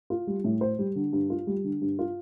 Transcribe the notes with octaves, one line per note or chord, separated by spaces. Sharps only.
F4
G3
A2
C5
G3
D3
G2
F4
G3
D3
G2
F4